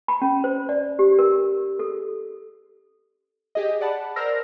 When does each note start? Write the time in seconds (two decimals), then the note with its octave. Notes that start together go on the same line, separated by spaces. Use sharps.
0.08 B5
0.22 C#4
0.44 C5
0.69 D5
0.99 G4
1.19 A#4
1.79 A4
3.55 G4 G#4 D#5
3.81 D5 F#5 A5 B5
4.16 A#4 C5 D5 E6 F6 A#6